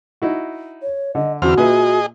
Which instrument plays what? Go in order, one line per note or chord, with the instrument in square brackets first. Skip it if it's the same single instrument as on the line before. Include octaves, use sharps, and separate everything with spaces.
[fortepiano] D#4 E4 F#4
[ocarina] C#5
[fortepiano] D3 [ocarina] D#5
[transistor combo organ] E2 C4 F6 [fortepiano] D3 [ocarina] F#4
[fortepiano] A#2 B4 E5 [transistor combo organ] G#4 D#5